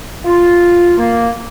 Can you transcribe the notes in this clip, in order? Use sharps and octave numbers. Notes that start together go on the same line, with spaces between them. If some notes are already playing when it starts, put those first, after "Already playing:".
F4
A#3